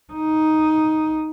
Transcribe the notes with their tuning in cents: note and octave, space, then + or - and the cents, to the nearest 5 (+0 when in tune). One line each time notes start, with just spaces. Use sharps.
D#4 +5